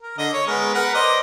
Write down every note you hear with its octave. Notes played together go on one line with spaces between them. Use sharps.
A#4
D3 D#5
C#5
G#3 B3 A#4
A#4 B4 F#5
C5 D5 D#5